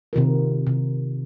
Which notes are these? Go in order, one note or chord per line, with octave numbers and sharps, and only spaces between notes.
C3 D#3 F4 A#4
C3